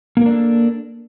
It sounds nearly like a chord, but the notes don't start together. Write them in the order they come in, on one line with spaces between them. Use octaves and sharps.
A#3 A#4 D4 A4